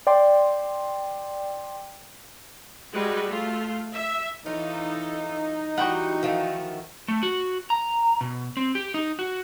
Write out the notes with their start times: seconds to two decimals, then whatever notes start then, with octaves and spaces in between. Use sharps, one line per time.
0.07 D5 G5 C6
2.93 G3 G#3 F#4 G#4 B4
3.26 A3 F4
3.94 E5
4.46 E3 C#4 D#4 F4 A4
5.78 E3 G3 F#4 D#5 F#5 G5 C#6
6.23 D#3 F3 A3
7.08 A3
7.23 F#4
7.70 A#5
8.21 B2
8.57 C4
8.75 G4
8.94 D#4
9.19 F#4